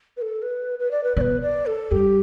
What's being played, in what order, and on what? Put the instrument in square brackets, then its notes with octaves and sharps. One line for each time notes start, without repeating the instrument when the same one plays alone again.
[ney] B4
A4
B4
B4
D5
B4
[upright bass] B2 [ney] D5
[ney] B4
D5
A4
[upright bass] G2 [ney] G4